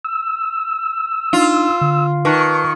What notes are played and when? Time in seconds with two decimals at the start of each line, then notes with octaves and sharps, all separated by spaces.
0.05 E6
1.33 D4 D#4 F4
1.81 D3
2.25 D#3 B4 A5 C#6 F#6